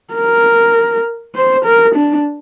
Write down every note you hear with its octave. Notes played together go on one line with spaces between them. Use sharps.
A#4
C5
A#4
D4